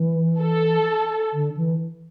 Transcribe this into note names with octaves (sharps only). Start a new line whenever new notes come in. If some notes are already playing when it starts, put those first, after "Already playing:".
Already playing: E3
A4
D3
E3